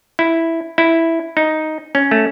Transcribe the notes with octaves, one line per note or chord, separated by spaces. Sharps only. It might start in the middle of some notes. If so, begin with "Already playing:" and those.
E4
E4
D#4
C#4
A3